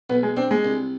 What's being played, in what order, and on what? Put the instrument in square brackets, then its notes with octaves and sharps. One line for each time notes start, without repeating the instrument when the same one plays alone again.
[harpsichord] B1 [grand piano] B3
[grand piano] G#3
[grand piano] C4 [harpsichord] D4
[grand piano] G#3
[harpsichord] C2